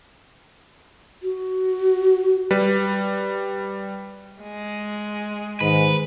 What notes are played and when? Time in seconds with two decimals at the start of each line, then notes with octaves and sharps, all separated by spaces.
1.23 F#4
2.51 G3 B4
4.43 G#3
5.61 G#2 D#3 B4